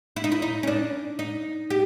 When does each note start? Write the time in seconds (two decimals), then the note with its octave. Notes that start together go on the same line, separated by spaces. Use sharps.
0.16 E4
0.24 D#4
0.32 E4
0.42 D#4
0.63 C#4
0.67 D4
1.19 D#4
1.70 G4